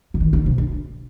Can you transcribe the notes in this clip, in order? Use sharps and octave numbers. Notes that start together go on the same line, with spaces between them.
D3
D#3
D3
C3
D3